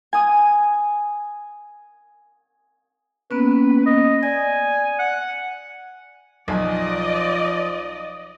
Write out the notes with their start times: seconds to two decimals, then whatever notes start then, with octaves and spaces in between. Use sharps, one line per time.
0.13 G#5 D#6
3.31 A#3 B3 C#4 B4
3.86 D#5
4.23 D5 G#5
4.99 F#5
6.48 B1 F3 D5 D#5 G#5